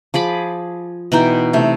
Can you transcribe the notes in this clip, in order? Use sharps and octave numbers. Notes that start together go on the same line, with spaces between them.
F3 G#4 B5 D6
B2 E3 D#4 G5
C3 A3